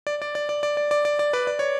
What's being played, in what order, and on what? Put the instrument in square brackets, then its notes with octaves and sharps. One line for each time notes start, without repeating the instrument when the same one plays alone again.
[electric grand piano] D5
D5
D5
D5
D5
D5
D5
D5
D5
B4 D5
D5
C#5